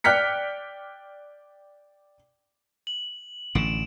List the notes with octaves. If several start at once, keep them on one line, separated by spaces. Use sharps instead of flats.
D5 G5 F6 F#6 B6 C#7
F#7
A1 D3 D7 E7